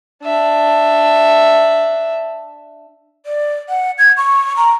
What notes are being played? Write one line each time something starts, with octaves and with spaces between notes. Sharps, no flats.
D4 E5
D5
F#5
G#6
C#6
A#5